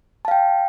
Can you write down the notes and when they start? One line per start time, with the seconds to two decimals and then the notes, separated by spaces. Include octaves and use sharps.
0.25 A5
0.28 F5
0.31 G5